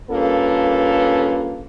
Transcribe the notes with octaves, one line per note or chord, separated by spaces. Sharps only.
G2 A#3 C#4 F4 A4 B4